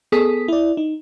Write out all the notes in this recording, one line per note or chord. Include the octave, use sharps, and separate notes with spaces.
B3 G#4 A4 D#6 B6
E4 D5
D#4